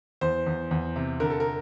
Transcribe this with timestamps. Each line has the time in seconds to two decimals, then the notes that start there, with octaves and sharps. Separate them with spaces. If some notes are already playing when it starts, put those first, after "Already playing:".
0.21 E2 C5
0.46 E2
0.71 E2
0.96 C3
1.20 D3 A#4
1.30 A4
1.40 A#4